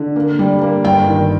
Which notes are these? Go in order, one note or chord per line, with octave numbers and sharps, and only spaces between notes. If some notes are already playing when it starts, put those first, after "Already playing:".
Already playing: D3
A#3
G3
A#3
G1 G5
D#3